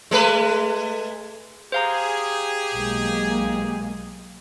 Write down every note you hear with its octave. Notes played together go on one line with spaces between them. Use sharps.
G#3 A3 B4
G4 G#4 C5 F5 A#5
B1 G#3 A#3